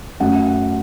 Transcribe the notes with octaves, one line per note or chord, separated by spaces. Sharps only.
F#2 F#3 A3 F#5
F#5